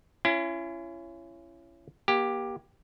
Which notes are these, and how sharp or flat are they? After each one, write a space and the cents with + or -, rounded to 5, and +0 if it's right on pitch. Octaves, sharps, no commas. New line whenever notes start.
C#4 +0 E4 +40
A#3 +30 G4 +5